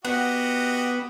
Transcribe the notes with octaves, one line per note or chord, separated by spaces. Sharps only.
B3 F#4 G4 D#5 F#5